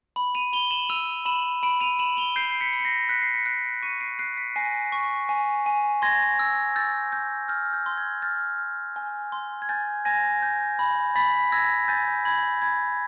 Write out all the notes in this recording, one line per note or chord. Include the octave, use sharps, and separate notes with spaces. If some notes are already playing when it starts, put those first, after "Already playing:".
B5
D#7 F7
B5 F7 G7
E7 F#7
E6 D#7 F7
B5 E7 F#7
B5 D7 E7
D#7 F7
B5 E7 F#7
F7 G7
G6 C7 D7
C7
B6 C#7
B5
C#7
A#6 C7
F#6 B6 C#7
C7
C#7
F#6 C7 D7
C#6 C#7 D#7
C7 D7
F#6 C7 D7
B6 C#7
G#5 A#6 C7
C#6
G#5
G#5
C6 G#6 A#6
E6
E6 G6 A6
G6
F6 G6
G6
C6
G#6
F6 G6 A6
F6
G#5
C6
G#6
G#5 G6 A6
G#5 G#6 A#6
G6
B5
B5 A6 B6
E6 G#6 A#6
G#5 G6 A6
B5 G#6
B5 G#6